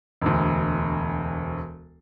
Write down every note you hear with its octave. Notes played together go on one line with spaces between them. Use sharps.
E1 D2